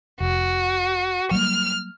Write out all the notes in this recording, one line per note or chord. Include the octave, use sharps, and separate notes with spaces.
F1 F#4
F#3 G3 A#3 F6